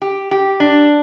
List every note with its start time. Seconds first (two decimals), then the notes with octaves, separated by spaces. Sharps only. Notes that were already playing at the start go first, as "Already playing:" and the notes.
0.02 G4
0.31 G4
0.60 D4